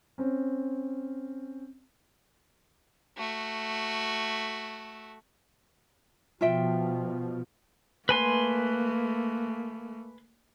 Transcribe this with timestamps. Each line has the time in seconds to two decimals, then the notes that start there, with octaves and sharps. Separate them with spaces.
0.18 C4 C#4
3.18 A3 F#4
6.41 B2 F3 F4 E5 G5
8.09 A3 A#3 B4 G#5 C6